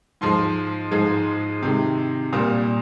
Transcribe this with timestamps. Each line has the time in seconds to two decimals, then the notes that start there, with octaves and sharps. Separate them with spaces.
0.21 G#2 F3 G#3 C6
0.91 G#2 F3 G#3
1.62 C3 D#3 G#3
2.33 A#2 G3 A#3 D#6